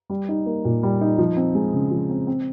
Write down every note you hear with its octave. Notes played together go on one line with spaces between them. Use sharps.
G3
D#4
A#3
A#2
G3
D#4
F3
C4
G#3
C#3
F3
C4
C4